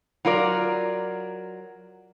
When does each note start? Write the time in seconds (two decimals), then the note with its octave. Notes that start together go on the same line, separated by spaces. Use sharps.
0.25 F#3 F4 A#4 D5